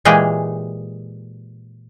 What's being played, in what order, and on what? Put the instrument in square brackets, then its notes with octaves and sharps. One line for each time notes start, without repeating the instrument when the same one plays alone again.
[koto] A#2 E3 G#3 G4 G#4 G5